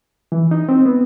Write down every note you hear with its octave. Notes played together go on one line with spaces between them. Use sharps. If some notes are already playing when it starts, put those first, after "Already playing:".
E3
D#4
C4
B3